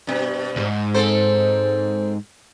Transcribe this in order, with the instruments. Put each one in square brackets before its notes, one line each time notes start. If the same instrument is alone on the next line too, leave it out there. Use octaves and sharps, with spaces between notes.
[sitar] G2 B2
[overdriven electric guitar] C#2 G#2
[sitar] C4 A4 C5